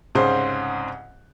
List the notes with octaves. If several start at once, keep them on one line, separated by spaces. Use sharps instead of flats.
C2 G#2 C#3 C4 C5